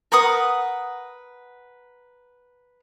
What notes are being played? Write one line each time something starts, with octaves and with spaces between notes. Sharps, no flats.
A#4 B4 F#5 D#6